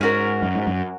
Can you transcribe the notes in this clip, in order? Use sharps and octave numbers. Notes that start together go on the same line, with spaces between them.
G#2 C#4 F#4 A#4
F#2
G#2
F#2